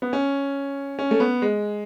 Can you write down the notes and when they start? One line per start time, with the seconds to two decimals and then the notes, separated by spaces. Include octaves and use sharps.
0.02 B3
0.13 C#4
0.99 C#4
1.11 A3
1.20 B3
1.42 G#3